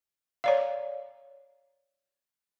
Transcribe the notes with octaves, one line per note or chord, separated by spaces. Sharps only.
C#5 D5 F5